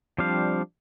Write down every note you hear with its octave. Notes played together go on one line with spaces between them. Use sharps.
F3 G3 C4 D4 F5